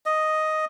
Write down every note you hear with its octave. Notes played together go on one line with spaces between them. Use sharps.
D#5